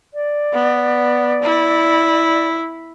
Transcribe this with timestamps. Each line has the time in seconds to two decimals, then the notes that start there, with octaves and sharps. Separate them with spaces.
0.14 D5
0.53 B3
1.43 E4